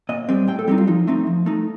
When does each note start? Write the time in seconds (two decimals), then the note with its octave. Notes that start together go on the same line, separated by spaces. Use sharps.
0.09 A#2 D#5
0.29 G3 C4
0.48 A2 G5
0.59 A4
0.68 G3 C4 D#4 G4
0.78 F4
0.87 F3 D#4
1.07 A3 C4 D#4
1.27 F3
1.46 A3 D#4